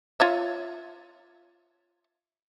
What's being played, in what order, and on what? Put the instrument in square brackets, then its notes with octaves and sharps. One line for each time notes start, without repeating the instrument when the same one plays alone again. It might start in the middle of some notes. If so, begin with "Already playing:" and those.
[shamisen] F4 C#5 E5